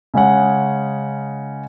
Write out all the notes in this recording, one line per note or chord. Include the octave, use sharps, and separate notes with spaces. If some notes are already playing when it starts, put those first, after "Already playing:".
C#3 G#3 C#4 F#5